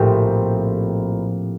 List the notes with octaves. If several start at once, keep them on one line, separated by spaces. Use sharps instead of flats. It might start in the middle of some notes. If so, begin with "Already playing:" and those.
Already playing: A#1 A2 A3 C4 G4